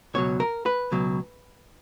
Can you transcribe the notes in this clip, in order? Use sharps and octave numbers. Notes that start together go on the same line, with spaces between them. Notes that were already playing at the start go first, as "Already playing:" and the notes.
C#2 B2 F#3 C#5
A#4
B4
C#2 B2 F#3